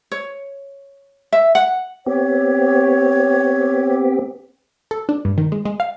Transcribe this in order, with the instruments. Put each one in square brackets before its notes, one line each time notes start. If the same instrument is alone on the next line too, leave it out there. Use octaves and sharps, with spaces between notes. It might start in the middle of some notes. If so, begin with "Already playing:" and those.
[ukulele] C#5
E5
F#5
[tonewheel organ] B3 C4 G4 [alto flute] C#5
[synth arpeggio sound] A4
D4
G2
D#3
G#3
G#3
F5